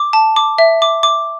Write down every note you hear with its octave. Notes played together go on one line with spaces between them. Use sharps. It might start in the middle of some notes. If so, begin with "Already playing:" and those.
Already playing: D6
A5
D6
E5
D6
D6